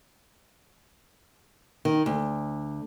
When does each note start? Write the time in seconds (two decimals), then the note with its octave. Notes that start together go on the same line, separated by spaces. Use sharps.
1.85 D#3
2.06 D2